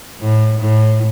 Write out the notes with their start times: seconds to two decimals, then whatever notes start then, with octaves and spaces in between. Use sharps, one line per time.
0.20 A2
0.59 A2